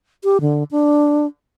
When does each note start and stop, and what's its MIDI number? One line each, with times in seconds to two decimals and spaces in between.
0.24 0.38 67
0.41 0.64 50
0.71 1.26 62